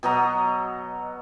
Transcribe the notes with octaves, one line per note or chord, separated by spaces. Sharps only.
B2 F#3 D#5 A#5